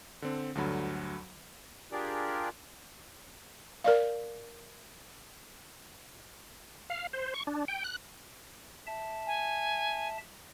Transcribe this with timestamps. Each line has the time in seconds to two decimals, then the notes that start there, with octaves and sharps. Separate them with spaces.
0.22 D3 C4
0.55 D2 G2 D3 F#3 B5
1.92 D4 F4 G4 G#4 A#4 D5
3.84 A#4 D5 F5
6.90 F5
7.13 C5
7.34 C#6
7.47 D4
7.68 G5
7.84 F#6
8.87 E5 A5
9.27 G#5